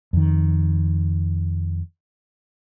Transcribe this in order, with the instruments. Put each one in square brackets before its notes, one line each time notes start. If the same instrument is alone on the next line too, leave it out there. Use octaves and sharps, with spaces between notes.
[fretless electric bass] F2 D#3